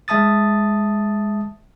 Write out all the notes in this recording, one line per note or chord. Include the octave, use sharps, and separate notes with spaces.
G#3 E5 A5 D#6 A6